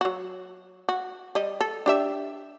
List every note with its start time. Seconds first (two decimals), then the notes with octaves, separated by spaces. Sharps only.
0.01 F#3 F#4
0.89 F#4
1.35 G3 D#5
1.61 A4
1.86 D4 G4 E5